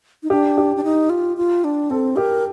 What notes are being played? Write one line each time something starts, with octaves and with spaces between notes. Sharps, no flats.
D#4
D4 G4
G4
D4
D#4
F4
F4
D4
C4 A4
G4 A#4